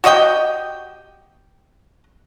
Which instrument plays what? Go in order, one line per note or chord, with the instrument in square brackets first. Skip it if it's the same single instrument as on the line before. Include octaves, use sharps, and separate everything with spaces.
[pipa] F#4 G4 D#5 G5